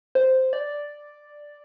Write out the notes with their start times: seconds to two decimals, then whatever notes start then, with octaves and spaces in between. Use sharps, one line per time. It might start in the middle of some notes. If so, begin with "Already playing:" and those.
0.15 C5
0.53 D5